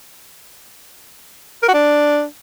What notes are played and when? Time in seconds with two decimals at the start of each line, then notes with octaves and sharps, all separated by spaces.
1.63 A#4
1.68 F#4
1.74 D4